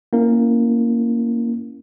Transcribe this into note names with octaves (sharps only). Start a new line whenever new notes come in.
A#3 C#4 E4 A#4